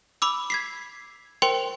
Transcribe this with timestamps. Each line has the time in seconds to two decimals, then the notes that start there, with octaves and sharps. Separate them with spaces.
0.22 B5 D6 E6
0.50 G#6 B6 C7
1.42 A#4 C5 G5 C6 C#7 F7